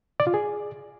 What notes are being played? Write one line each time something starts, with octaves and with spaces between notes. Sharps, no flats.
D5
F4
G#4